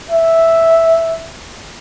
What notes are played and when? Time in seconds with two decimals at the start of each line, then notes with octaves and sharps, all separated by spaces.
0.11 E5